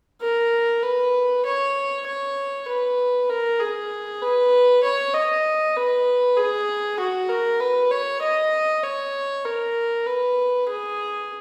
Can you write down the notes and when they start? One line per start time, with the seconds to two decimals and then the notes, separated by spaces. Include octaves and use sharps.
0.22 A#4
0.83 B4
1.45 C#5
2.06 C#5
2.68 B4
3.29 A#4
3.60 G#4
4.22 B4
4.83 C#5
5.14 D#5
5.76 B4
6.37 G#4
6.99 F#4
7.29 A#4
7.60 B4
7.91 C#5
8.22 D#5
8.83 C#5
9.45 A#4
10.06 B4
10.68 G#4